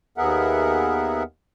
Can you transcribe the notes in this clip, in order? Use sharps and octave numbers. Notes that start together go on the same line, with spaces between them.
D#2 B3 G#4 A#4 E5 F#5